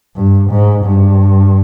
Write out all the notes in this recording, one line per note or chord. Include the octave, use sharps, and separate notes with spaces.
G2
G#2
G2